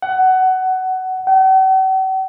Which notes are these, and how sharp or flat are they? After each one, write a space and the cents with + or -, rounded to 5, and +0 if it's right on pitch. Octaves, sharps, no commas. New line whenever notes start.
F#5 +15
F#5 +45